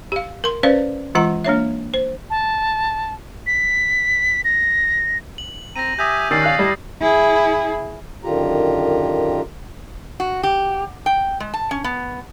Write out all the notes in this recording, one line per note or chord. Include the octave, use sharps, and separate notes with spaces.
G4 F5
A#4 C6
C#4 B4 C5 D5 F5
E3 G#3 F4 F#5 A#5
A#3 D4 C#5 E5
C5
A5
B6
A#6
F#7
C4 A#5 A#6 D#7
G4 E5 G#5 D#6 G6
D#3 C#4 G4 D5 E6 A6 C7
F5 F#6
G3 E4 D#5 A5
E4 G#4
F#2 D3 D#3 F4 G4 A#5
F#4
G4
G5
G#3
A5
C#4
B3